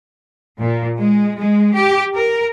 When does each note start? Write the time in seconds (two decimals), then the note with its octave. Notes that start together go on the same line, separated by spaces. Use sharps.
0.60 A#2
0.98 G#3
1.37 G#3
1.73 G4
2.15 A#4